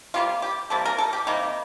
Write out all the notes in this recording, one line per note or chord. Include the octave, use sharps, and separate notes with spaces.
C3 G3 A#3 F4
G4
C3 G3 A#3 A4
A#4
A4
G4
C3 G3 A#3 D#4